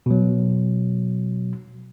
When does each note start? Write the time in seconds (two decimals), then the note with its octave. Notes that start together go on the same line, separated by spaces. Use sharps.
0.06 B2 F#3